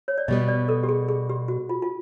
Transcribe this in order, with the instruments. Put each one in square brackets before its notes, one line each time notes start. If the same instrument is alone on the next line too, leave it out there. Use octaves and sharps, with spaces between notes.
[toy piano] C#5
D5
[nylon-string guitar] B2 G3 B3 [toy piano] D#5
[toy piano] D5
A4
G4
G#4
G#4
G4
F#4
F4
F4